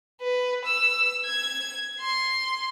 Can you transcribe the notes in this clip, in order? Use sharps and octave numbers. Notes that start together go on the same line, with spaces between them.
B4
E6
G#6
C6